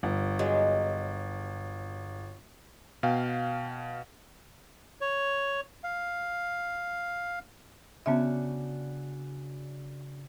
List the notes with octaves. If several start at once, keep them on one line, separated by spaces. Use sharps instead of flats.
G1
F#3 G#3
B2 F5 G5
C#5
F5
C#3 B3 C#4 D4 F#4 E5